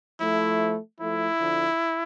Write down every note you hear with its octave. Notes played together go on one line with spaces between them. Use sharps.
F3 A3 E4
F3 A3 E4
D3 F3